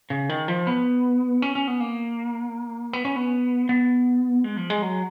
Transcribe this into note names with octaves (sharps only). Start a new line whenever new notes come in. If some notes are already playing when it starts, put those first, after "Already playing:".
C#3
D#3
F3
B3
C#4
C#4
B3
A#3
B3
C#4
B3
B3
G#3
F3
G#3
F#3